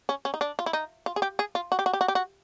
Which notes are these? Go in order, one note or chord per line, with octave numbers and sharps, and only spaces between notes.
C#4
C#4
D#4
D4
F4
E4
D#4
F4
G#4
G4
G#4
F4
F#4
G4
F#4
G4
F#4
G4
F#4